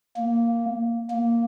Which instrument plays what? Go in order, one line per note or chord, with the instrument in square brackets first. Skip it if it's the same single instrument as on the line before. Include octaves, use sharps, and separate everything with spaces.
[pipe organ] A#3
A#3